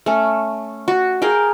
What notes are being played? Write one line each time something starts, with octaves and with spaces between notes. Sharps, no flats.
A3 C#4
F#4
G#4 A#4 F5 G5